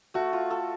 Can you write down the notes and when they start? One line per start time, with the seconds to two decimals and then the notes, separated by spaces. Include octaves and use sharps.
0.14 A3 F#4
0.33 F4
0.50 A4